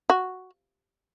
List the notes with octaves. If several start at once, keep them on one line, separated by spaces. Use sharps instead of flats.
F#4